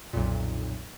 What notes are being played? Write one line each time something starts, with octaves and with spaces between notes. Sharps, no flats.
B1 F2 A#2